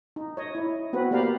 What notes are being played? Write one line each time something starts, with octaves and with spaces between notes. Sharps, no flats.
D#4
C#5 D#5
E4
B3 C4 F#4 B4
A#3 G4 D5 F5 A#5 B5